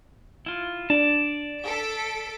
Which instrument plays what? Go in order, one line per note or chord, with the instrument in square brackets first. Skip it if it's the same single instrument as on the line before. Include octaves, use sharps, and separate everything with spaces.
[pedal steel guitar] E4 F4
[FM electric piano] D4 [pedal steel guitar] D5 A5
[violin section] A4 B6 D7